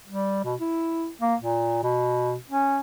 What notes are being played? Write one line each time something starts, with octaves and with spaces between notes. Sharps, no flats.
G3
B2
E4
A#3
A#2
B2
C#4